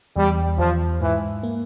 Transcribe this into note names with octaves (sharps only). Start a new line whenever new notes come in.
E2 G3
E2 F3
G#2 E3
A#3